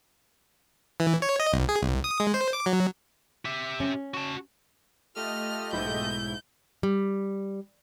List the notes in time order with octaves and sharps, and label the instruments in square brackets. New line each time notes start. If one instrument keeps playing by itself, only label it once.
[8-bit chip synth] E3
C#5
D#5
C2
G#4
C2
D#6
G#3
C5
D6
F#3
[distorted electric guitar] G4 E5
[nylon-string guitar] C#4
[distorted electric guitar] F#4 A5
[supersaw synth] A3 D#5 [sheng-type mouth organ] F4 G4 A4 [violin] F6
[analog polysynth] B1 G#2 E4 [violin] G6
[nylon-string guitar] G3